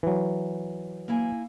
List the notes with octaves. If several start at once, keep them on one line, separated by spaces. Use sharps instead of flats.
E3 F#3
A#3 E4 G#5